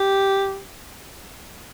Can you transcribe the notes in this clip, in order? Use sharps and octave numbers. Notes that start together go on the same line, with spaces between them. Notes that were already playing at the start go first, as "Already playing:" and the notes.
Already playing: G4